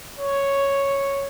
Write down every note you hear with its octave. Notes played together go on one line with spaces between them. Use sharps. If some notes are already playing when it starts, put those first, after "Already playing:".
C#5